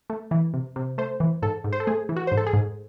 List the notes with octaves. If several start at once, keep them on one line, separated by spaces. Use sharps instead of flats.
A3
E3
C3
C3
A3 C5
E3
G#2 A4
G#2
C5
A4
A3 G#4
E3
F#4
C5
G#2
A4
G#4
G#2